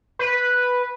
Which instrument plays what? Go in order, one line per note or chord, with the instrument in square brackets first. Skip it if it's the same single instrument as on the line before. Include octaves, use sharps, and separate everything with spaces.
[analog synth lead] B4